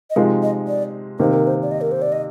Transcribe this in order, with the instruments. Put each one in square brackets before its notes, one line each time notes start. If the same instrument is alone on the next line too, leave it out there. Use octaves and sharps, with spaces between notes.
[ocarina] D#5
[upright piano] C3 F3 G#3 D#4 [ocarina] F5
[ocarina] D#5
D5
[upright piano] C3 D#3 A#3 D#4 [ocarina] C5
[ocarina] A#4
C5
D5
D#5
A#4
C5
D5
D#5